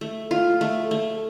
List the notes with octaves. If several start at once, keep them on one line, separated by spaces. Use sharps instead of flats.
A3
F4
A3
A3